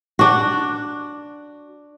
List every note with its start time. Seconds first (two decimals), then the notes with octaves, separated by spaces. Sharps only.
0.19 D4 F#4